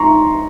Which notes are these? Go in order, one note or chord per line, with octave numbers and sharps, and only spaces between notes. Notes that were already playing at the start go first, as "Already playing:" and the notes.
Already playing: A#5 C6 C#6